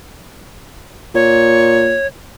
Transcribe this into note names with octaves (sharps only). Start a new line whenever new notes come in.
A#2 C#5